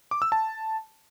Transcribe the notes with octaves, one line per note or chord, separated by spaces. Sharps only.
D6
E6
A5